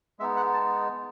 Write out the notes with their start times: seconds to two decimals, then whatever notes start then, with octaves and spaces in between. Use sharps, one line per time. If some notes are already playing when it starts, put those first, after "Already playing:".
0.19 G#3 B3 D#4 E5
0.36 F#5
0.54 A5